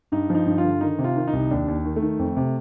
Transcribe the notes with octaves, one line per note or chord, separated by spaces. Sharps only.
G2 D#4
F3
D#4
G2
F4
D3
D#3 D#4
C3
F4
D#3
D#4
C2
D#2 D4
D#2
D#3
A3
D#3
F2
C3